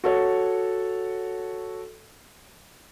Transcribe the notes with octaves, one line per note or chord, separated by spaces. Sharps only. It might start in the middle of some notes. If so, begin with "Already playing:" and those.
F#4 A4 C#5